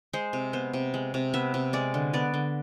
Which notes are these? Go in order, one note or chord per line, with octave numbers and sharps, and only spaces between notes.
G#3 C5
C3
B3 C5
C3
G#3
C3
B3 E5
C3
G#3 D5
D3
B3 D5
D3